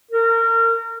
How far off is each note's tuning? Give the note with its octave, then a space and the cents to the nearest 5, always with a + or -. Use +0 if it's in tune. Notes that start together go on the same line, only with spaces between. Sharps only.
A#4 -30